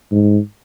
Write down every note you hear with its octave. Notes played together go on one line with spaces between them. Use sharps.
G#2